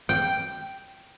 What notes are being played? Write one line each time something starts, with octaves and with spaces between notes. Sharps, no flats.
G5